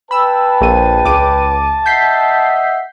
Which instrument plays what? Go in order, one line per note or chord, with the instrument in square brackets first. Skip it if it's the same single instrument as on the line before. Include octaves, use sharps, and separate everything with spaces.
[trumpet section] B4 G5 [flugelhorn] A5 [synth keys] B5 E6
[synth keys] A#1 D#7
C#2 D6 D#7
[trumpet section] D#5 E5 F#5 [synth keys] G6 B6 C7